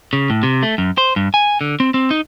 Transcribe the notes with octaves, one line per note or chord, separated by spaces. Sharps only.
C#3
A2
C3
A3
F#2
C5
G2
G#5
D3
C4
C4
D#4